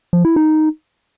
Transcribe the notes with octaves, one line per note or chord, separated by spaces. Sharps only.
F3
E4
D#4